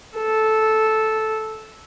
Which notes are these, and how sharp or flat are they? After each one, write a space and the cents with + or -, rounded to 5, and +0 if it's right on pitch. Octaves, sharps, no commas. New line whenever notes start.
A4 -10